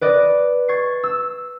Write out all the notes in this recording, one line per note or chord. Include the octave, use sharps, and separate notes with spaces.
B4 D5 D#5
C#6 G#6 A6 C7
E6